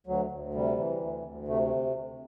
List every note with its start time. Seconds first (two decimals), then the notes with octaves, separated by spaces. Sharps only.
0.07 D2 F#3
0.31 D2
0.54 C3 G3
0.78 E3
1.01 D2
1.25 D2
1.48 C3 A3